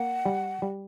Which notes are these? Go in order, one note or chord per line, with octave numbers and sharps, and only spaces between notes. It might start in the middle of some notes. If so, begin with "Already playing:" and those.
Already playing: A#3 F#5
G3
G3